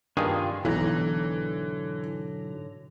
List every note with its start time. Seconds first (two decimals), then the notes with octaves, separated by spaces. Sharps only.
0.17 G2 D#3 D4 F4 G#4
0.65 B1 G#2 B2 D3 E3 F#3 A#5